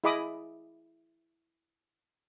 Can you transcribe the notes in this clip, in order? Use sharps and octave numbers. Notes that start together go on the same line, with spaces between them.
E4 G#4 D#5 B5 D6 D#6